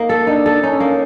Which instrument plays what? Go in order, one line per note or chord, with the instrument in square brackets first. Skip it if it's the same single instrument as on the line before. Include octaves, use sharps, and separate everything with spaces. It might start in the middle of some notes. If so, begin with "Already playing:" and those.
Already playing: [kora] A#3 D#4
A4
[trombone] D4 [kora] D#4
[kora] A4
[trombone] C#4 [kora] D#4
[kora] A#3